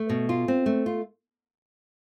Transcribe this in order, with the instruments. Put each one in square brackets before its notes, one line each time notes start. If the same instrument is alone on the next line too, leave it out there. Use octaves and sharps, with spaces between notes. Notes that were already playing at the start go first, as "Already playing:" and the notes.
Already playing: [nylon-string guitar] A3
B2
F4
C4
A3
F4